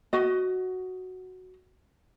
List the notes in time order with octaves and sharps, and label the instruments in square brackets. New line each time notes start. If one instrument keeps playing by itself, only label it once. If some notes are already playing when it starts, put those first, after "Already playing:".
[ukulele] F#4 D#5